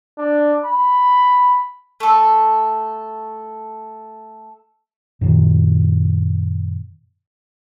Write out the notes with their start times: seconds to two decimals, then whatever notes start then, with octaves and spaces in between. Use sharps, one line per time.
0.18 D4
0.66 B5
2.00 A3 A4
5.21 F#2 A#2 D#3